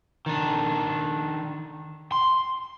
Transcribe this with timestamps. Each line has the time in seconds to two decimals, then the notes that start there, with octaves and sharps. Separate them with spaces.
0.26 D#3 D4
2.12 C6